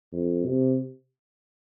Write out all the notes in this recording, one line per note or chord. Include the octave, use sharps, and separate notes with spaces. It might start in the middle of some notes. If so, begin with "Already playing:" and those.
F2
C3